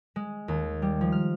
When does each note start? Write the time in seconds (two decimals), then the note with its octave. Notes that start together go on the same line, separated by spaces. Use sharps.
0.16 G#3
0.48 D#2
0.82 G3
1.01 F3
1.12 F6